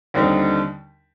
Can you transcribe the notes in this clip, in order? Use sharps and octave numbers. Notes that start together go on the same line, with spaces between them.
D#2 D3 G3 C4 D#4